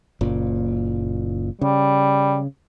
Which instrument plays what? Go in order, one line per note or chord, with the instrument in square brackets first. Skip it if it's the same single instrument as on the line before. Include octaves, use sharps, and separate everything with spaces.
[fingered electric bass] F#1 A#2
[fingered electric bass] C#3 [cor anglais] G3